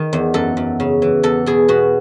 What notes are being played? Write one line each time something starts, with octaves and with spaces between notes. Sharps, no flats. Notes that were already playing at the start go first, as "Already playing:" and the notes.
Already playing: D#3
E2
F#2 A4
F#2
C#3
E3
E2 A4
B2 G#4
B2 F#4